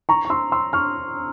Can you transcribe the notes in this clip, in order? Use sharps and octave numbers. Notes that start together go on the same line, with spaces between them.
A#5 C#6
C#6
C6 E6
C6 E6
C#6 F6